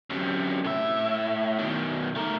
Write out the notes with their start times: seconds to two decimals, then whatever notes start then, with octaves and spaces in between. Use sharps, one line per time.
0.10 F#2 C3
0.65 A2 E5
1.59 B2 D#3
2.15 A3 A#4